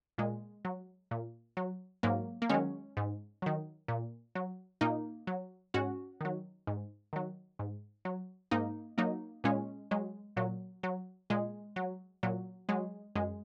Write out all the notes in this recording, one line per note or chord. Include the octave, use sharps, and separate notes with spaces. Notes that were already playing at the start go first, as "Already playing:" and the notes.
A#2 G#3
F#3
A#2
F#3
G#2 F#3 A#3
A#3
D#3 F#3 G#3 C#4
G#2
D#3 F#3
A#2
F#3
A#2 A#3 D#4
F#3
G#2 C#4 F#4
D#3 F#3
G#2
D#3 F#3
G#2
F#3
G#2 A#3 D#4
F#3 A#3 D#4
A#2 G#3 C#4
F#3 G#3
A#2 F#3
F#3
A#2 G#3
F#3
A#2 F#3
F#3 G#3
F#2 G#3